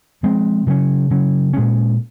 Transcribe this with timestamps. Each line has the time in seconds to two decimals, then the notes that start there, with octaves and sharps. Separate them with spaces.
0.23 F3 G#3 C4
0.67 C#3 F#3 C#4
1.10 C#3 F#3 C#4
1.53 A#2 G#3 C#4